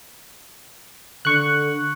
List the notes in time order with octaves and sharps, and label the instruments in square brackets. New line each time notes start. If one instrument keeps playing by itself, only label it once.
[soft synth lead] D3 [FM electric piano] C#6 F#6